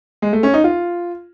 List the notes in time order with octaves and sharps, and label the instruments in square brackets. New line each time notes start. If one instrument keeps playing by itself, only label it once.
[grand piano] G#3
A3
C#4
D#4
F4